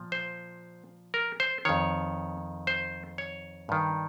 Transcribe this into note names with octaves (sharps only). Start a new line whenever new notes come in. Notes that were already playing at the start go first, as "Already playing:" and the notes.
Already playing: A#2 F3
C5
A#4
C5
F2 D#3 C#5
C5
C#5
G2 D#3